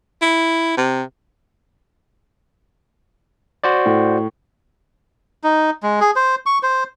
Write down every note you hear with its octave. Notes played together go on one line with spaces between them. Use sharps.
E4
C3
F#4 C5 D5
A2
D#4
G#3
G#4
C5
C#6
C5